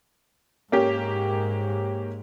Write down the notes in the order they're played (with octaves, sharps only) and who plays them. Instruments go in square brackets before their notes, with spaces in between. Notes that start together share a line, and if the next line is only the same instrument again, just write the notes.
[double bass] G#2 [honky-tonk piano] A#3 C#4 G4